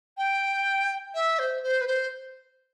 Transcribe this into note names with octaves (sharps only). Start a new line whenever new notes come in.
G5
E5
C5
C5
B4
C5